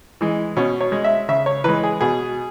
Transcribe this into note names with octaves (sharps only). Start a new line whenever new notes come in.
E3 G#3
B2 C#4
C#5
G#3
E5
C#3 E5
C#5
E3 G#3 B4
G#4
B2 G#4